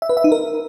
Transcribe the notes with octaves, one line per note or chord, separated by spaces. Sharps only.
E5
B4
E5
D#4
A#4